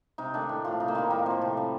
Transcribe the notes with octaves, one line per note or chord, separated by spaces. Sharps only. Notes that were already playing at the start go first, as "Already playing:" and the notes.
C3 D#4
D#3 A3 D4
A2
F3 A3 F4
C3 D#4
A#3
D#3 G3 C4
A2 A#3
F3 A3 C4
C3
G3